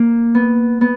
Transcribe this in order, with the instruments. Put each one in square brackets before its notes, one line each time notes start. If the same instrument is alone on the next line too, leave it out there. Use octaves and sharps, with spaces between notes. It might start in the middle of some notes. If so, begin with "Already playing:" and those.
Already playing: [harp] A#3
B3
B3